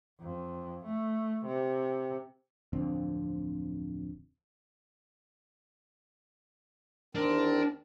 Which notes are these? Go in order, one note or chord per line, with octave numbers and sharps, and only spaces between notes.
F2
A3
C3
D1 F2 D3 C4
E2 D#3 C4 D4 A#4